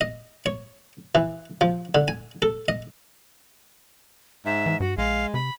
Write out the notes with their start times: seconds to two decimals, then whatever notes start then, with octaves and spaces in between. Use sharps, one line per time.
0.01 D#5
0.46 C#5
1.15 E3
1.61 F3
1.95 D3
2.08 G#5
2.42 A4
2.68 D#5
4.45 G#2 E5
4.66 E3
4.80 G2 F#4
4.98 A#1 G#3 F5
5.34 C3 B5